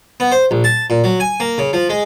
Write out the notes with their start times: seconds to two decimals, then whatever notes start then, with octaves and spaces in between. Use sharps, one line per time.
0.20 B3
0.32 C5
0.51 A#1
0.64 A5
0.90 A#2
1.04 F#3
1.20 G#5
1.40 A#3
1.58 C#3
1.73 F3
1.89 G#3